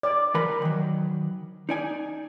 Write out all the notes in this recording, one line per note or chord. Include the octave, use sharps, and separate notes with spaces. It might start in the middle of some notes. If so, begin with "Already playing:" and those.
D5
E3 A#4 B5
D#3 F#3
D#4 D5 G#5